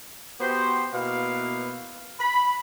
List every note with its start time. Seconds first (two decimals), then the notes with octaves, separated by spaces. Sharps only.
0.40 B3 F#4 G4 C5
0.93 B2 A#3 E4 B4 F5
2.19 B5